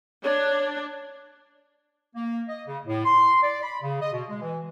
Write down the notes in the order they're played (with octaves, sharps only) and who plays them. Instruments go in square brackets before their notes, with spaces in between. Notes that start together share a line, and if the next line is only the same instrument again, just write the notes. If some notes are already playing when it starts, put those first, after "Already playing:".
[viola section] D4 [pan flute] C#5
[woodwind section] A#3
D#5
C#3
A2
C6
D5
B5
C#3
D#5
B2
G#3
E3